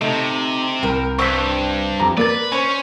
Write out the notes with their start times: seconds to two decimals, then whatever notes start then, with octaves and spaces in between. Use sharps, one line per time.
0.01 C3 A3 D#4
0.83 C2 A#4 G5
1.19 G2 C5 C#6 E6 F#6 G6 B6
2.00 F2 G4 A#5
2.17 A#3 A#4 B4 D5 A6
2.52 C#4 C5 C#5